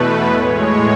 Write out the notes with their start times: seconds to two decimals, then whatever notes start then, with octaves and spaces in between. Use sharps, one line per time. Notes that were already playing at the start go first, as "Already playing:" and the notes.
Already playing: E2 B2 A3 B4
0.28 A2 G#3 C#5